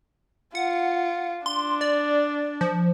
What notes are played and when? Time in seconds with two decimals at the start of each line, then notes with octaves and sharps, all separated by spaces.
0.55 F4 F#5
1.46 D4 C6
1.81 D5
2.61 F3